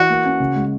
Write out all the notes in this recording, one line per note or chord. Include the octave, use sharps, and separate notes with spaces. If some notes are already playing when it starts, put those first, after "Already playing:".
Already playing: E3 F#4
A#3
C#4
C#3
G#3